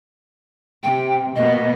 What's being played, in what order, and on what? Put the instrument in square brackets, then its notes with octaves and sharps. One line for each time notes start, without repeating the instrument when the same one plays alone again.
[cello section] C3 [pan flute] G5
[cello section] B2 A#3 B3 [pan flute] D#5